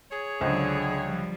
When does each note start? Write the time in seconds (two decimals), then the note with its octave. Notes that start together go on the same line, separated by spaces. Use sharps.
0.12 G#4 C#5
0.41 C#2 D3 F#3 C5
1.00 F3 G3